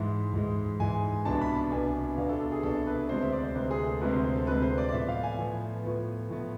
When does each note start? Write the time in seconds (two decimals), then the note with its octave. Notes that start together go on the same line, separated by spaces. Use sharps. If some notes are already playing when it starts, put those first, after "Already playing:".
Already playing: G#2 E3 G#3 E5
0.33 G#2 E3 G#3
0.80 G#2 E3 G#3 G#5
1.25 C2 B2 B3 D4 A5
1.41 B5
1.56 A5
1.72 C2 B2 B3 D4 G#5
2.18 C2 B2 B3 D4 F5
2.29 A4
2.40 A4
2.52 G#4
2.63 C2 B2 B3 D4 A4
2.87 B4
3.09 D2 C3 G#3 C4 C5
3.21 E5
3.32 D5
3.43 C5
3.55 D2 C3 G#3 C4 B4
3.71 G#4
3.86 A4
4.01 D2 C3 G#3 C4 B4
4.12 C5
4.24 C5
4.36 A4
4.47 D2 C3 G#3 C4 B4
4.62 C5
4.78 D5
4.89 D5
4.92 A2 F3 B3 E5
5.08 F5
5.23 G#5
5.39 A2 F3 B3
5.85 A2 F3 B3
6.31 A2 F3 B3